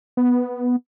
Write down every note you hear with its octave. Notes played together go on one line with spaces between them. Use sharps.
B3